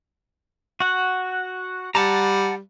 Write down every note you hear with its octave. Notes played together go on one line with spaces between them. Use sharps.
F#4 F#5
G3 F#5 A5 A#5